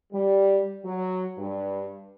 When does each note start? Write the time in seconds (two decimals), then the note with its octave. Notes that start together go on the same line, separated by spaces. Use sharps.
0.12 G3
0.84 F#3
1.37 G2